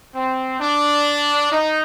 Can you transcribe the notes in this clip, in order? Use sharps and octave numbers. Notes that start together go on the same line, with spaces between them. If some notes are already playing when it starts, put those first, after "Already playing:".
C4
D4
D#4